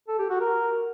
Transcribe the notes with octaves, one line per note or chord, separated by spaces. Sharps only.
A4
G4
F#4
A#4